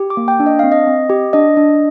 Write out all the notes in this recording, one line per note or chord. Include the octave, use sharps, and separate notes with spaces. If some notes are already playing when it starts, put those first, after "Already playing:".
Already playing: G4
D6
A#3
G5
D4
D#5
C4 F5
D#5
C4
G4
D4 D#5
D4